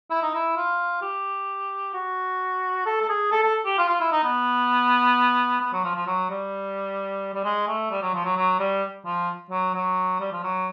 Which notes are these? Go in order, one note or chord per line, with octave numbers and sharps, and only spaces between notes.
E4
D#4
E4
F4
G4
F#4
A4
A4
G#4
A4
A4
G4
F4
F4
E4
D#4
B3
B3
F#3
F3
F3
F#3
G3
G3
G#3
A3
G3
F#3
F3
F#3
F#3
G3
F3
F#3
F#3
G3
F3
F#3